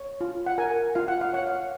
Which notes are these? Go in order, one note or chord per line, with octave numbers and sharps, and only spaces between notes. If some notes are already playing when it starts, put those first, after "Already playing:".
Already playing: C#5
F4
F#5
A#4 G#5
F4 F5
F#5
F5
C#5 F#5
F5